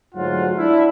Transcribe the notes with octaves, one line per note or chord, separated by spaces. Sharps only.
D2 G#2 F#3 F4 F#5
D4 E4